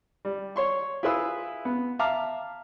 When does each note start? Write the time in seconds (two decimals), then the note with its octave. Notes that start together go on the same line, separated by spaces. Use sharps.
0.25 G3
0.56 C#5 C6 C#6
1.03 E4 F4 G#4 B4 C6 E6
1.65 B3
1.99 E5 F5 A5 A#5 D6 F6